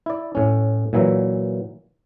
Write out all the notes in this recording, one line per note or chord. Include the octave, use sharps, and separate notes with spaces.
E4 D5
A2 C#4
A#2 E3 F#3 E5